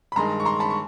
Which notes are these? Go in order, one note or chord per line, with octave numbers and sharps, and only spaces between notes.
B5
G2 D#3 G#3 A#5 C6
C#6
A#5 C6
A5 B5
C#6